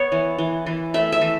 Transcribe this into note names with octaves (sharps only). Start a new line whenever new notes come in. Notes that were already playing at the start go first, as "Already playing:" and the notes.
Already playing: B3 C#5
E3
E3
E3
A3 E5
E5
E3